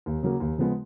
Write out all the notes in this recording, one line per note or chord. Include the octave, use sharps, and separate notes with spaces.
D#2
C#3 F#3 A#3
D#2
C#3 F3 G#3 B3